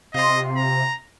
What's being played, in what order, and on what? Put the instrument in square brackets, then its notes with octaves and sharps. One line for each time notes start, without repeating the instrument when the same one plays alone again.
[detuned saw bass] C3 [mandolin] F4 C6 [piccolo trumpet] D#5
[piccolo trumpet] A#5